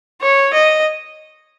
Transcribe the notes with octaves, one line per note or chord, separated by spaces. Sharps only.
C#5
D#5